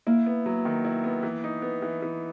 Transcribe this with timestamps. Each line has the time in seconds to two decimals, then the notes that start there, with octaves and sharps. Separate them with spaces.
0.07 A#3 E4
0.26 B3
0.46 F#3
0.65 D#3
0.84 E4
1.04 B3
1.23 E3
1.44 D#4
1.62 B3
1.82 E3
2.02 E3